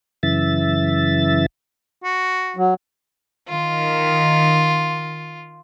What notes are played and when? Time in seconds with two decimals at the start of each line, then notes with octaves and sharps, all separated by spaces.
0.23 F#2 C#3 E3 E5 A6
2.04 F#4
2.56 F#3
3.49 D#3 F4